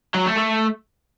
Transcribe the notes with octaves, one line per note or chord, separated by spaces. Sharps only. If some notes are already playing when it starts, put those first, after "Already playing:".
F#3
A3
A3